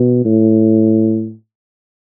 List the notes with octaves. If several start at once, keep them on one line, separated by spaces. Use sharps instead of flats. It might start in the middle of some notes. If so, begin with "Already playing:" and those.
Already playing: B2
A2